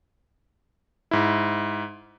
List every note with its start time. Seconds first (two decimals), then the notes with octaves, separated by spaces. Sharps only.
1.11 G#2 E4